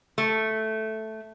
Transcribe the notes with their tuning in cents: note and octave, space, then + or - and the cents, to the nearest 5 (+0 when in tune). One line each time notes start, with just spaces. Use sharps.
A3 -5